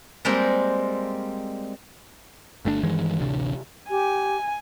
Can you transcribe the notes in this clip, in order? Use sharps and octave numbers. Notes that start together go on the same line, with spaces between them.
G3 G#3 A#3 C4
G1 A3 C4 D4
G2 D#3 E3 G#3
A1 D2 C3 D4
G4 G#5